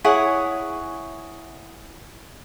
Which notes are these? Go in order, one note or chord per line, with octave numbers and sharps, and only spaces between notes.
E4 G#4 C#5 F#5